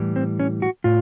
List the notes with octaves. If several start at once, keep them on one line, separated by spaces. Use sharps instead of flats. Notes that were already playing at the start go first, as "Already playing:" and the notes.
Already playing: A2 E3 G3
C4
C#4
F#4
A2 F4